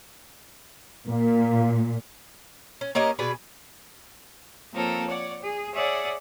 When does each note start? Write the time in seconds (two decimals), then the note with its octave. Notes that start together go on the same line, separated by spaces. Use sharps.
1.08 A#2 A#3
2.81 C#4
2.95 A#3 C#4 G4 D#5
3.19 B2 G#4 B4 D5
4.73 F3 A#3 C4 A4 A#4 C#5
5.07 C#5 D5 F#5
5.42 G#4
5.73 G#4 C#5 D5 E5 F#5